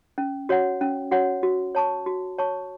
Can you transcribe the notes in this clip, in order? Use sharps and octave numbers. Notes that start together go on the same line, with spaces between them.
C#4
F#4 C#5 F#5
C#4
F#4 C#5 F#5
F#4
C#5 A5 C#6
F#4
C#5 A5 C#6